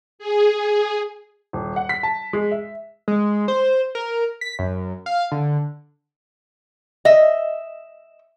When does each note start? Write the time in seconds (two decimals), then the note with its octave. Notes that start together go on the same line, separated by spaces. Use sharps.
0.19 G#4
1.53 D#1
1.76 F#5
1.89 B6
2.03 A5
2.33 G#3
2.52 E5
3.08 G#3
3.48 C5
3.95 A#4
4.41 B6
4.59 F#2
5.06 F5
5.32 D3
7.05 D#5 E5